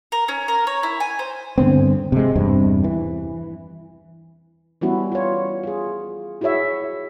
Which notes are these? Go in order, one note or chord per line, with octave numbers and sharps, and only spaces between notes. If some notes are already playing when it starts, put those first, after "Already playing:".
A#4
C#4
A#4
C#5
E4
G#5
C5
G2 D3 B3 C4
C3 G#3
E2 G2 C3
E3
E3 G3 B3 C#4 E4 F#4
F4 C#5
F4 G#4
E4 F#4 G#4 C#5 E5